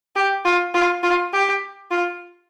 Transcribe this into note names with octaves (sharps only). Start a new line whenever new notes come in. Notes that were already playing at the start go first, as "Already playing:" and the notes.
G4
F4
F4
F4
G4
F4